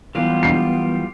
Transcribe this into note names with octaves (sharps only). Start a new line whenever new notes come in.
F#2 E3 G3 B3 F4 G4 F5
C7